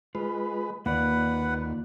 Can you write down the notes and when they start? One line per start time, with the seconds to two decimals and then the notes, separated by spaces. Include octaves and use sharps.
0.15 G#3 F4 B4
0.86 D#2 A#3 F4 B4 D5 F#5